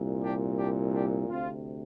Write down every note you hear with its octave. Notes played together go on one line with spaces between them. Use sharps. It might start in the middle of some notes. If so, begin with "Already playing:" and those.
Already playing: C2 A#2
D4 G4
D4 G4
D4 G4
D2 C3 C4 F4